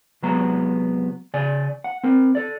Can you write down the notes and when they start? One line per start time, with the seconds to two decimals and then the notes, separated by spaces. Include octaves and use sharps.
0.23 C2 F#3 G#3 B3 F#4 A#5
1.34 C#3 D5 G#5
1.84 F#5
2.04 C4 A#4
2.35 A4 D5